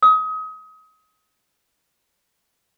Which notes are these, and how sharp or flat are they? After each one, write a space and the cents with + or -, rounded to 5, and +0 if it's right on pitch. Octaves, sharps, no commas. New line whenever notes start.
D#6 +30